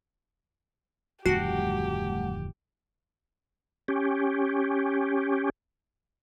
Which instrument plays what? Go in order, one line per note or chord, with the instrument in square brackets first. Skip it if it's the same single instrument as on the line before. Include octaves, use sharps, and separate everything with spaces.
[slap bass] D1 F2 D#3 [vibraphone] G3 A3 F#5 [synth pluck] F#4 [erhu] G4
[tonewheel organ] C#4 G4